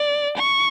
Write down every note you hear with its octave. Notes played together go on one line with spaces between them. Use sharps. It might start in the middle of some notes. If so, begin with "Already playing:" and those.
Already playing: D5
C#6